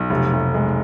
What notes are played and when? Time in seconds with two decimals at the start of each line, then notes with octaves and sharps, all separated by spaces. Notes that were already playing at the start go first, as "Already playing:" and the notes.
Already playing: B1
0.10 F1
0.33 F1
0.54 G#3